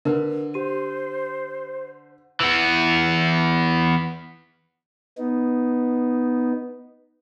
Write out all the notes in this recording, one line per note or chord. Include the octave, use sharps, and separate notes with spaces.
D3 A#4 B4
G4 C5 D#7
E3 B3
B3 D#4